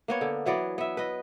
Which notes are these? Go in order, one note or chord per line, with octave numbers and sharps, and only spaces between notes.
A#3 B3 C#5
D3
E3 F#3 B3 D5
B3 E5
B4 D#5